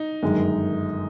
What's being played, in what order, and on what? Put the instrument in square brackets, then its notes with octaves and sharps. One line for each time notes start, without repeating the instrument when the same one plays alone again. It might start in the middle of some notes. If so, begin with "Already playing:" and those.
Already playing: [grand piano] D#4
[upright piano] G1 F#2 D#3 G#3